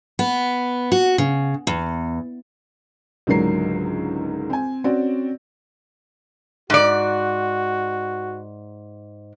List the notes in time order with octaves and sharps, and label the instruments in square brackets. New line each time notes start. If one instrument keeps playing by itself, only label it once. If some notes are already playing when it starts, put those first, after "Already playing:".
[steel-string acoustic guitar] B3
F#4
C#3
E2
[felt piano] C#2 G#2 D3 F#3 A#4 C7
C4 G#5
C4 C#4 F#4 D5
[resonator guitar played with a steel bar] G#2 D5 [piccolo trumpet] F#4